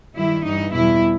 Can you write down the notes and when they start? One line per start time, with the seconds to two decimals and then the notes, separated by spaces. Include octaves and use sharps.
0.14 G2 D#3 G3 E4
0.44 G2 E3 G3 D#4
0.72 E2 B2 G3 E4